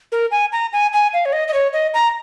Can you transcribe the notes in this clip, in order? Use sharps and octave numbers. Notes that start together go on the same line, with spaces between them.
A#4
G#5
A#5
G#5
G#5
F5
C#5
D#5
D#5
C#5
D#5
A#5